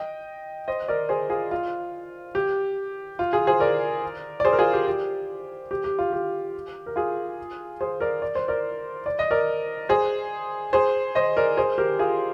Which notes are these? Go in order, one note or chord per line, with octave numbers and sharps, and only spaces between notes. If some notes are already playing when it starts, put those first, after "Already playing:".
Already playing: D#5 G5
C5 D#5
A#4 D5
G#4 C5
F4 G#4
F4
G4
F4
F4 G#4
G#4 C5
A#4 D5
D5
G#4 C5
A#4
F4 G#4
G4
G4
G4
G4
F4
G4
A#4
F4 G#4
G#4 C5
A#4 D5
D5
C5
A#4 D5
D5
D#5
A#4 D5
G#4 C5
G#4 C5
C5 D#5
A#4 D5
G#4 C5
G4 A#4
F4 G#4